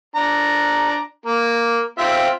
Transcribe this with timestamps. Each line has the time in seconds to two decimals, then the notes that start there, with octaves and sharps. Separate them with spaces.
0.16 D4 A#5
1.26 A#3
1.99 C4 F4 E5